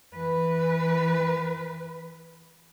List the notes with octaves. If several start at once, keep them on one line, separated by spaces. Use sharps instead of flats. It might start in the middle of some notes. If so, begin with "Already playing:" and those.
E3 B4